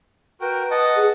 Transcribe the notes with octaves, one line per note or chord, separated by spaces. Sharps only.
F#4 A#4 B4 G5
D#5 F#5 A5
G#4